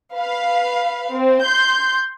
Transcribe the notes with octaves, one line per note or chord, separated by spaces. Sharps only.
B4 F5
C4
C6 G6